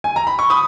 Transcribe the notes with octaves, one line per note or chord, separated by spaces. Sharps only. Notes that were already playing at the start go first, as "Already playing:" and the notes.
G#5
A#5
B5
C#6
B5 D#6